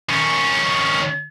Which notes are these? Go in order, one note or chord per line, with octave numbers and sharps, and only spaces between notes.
D#3 C#4